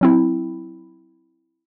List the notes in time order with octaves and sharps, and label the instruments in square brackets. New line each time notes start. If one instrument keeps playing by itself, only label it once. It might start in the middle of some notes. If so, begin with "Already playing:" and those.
[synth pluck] F#3 C4 E4